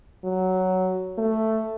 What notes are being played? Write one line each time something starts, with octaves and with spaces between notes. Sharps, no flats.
F#3
A3